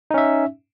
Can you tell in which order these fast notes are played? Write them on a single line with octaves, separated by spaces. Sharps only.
D#4 C#4 E5